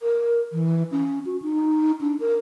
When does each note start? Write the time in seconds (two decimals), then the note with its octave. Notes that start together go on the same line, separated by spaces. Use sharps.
0.01 A#4
0.53 E3
0.92 C#4
1.26 F#4
1.42 D#4
2.01 D4
2.20 A#4